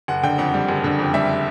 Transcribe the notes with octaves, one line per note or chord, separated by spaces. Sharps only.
F#1 F#5
D3 G5
F2 F#5
G3
F#1
D3
F2
G3 E5